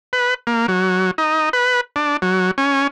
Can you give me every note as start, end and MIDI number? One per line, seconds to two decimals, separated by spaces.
0.13 0.34 71
0.47 0.66 58
0.68 1.11 54
1.18 1.49 63
1.53 1.81 71
1.96 2.17 62
2.22 2.51 54
2.58 2.87 61